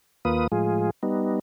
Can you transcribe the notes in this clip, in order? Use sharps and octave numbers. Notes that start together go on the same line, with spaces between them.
D#2 A#3 F4 B4 D#6
A2 F3 G#3 F4 G#4
G3 B3 D#4